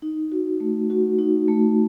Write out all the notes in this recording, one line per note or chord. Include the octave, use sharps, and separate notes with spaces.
D#4
F#4
A3
F#4
D#4
A3